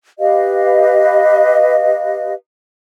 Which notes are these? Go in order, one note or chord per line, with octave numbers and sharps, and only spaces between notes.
G4 B4 D#5 F5